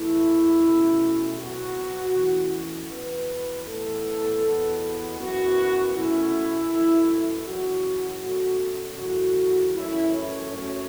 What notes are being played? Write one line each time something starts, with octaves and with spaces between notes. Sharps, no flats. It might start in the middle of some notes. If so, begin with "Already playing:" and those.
Already playing: E2 E3 A3 E4
B2 A3 C#4
B2 F#3 B3 F#4
E2 E3 A3 C#4
E2 B2 B3 B4
A2 E3 B3 A4
E2 B2 B3
F#2 E3 B3 F#4
B2 A3 C#4 E4
F#2 E3 A3
F#2 C#3 E3 C#4 F#4
B2 F#3 A3 C#4
E2 C#3 F#3 A3 F#4
F#2 E3 A3 C#4 E4
C#4
F#2 F#3 A3 C#4